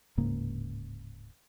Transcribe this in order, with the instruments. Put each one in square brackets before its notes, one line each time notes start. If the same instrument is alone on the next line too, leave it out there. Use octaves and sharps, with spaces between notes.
[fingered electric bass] D1 G#2 C#3 A#3